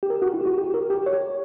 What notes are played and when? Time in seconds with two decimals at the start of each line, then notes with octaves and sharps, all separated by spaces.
0.03 G4
0.10 A#4
0.22 F#4
0.34 E4
0.41 G4
0.46 F#4
0.58 G4
0.74 A#4
0.90 G4
1.06 C#5